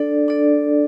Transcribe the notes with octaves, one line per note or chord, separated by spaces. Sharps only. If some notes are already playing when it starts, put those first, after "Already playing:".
Already playing: D4 A4 D5
D4 A4 D5